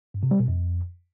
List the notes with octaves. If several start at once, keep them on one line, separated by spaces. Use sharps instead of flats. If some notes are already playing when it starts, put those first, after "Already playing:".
G2
C3
G3
B2
F2